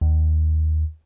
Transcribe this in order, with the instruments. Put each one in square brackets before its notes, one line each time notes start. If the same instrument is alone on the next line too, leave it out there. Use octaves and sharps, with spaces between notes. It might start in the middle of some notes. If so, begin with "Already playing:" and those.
[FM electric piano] D#2